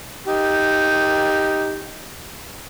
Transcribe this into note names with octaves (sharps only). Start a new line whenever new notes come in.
D#4 G4